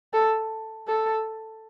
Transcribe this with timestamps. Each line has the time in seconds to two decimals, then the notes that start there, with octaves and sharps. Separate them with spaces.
0.13 A4
0.88 A4